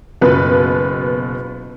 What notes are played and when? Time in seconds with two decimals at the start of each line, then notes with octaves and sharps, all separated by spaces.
0.21 F#1 B2 F4 B4